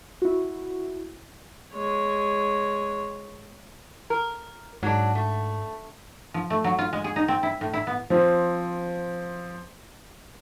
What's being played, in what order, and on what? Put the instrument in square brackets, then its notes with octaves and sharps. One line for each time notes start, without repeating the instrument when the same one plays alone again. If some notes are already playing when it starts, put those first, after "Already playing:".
[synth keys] E4 F#4
[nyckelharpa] G#3 C#5
[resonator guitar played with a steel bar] A#4
[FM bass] G#2 [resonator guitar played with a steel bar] F#3 D4
[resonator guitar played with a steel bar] A3
[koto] F3
A3
F#3
F4
G#3
G#4
D#4
C4
E4
A2
E4
B3
[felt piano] F3 C4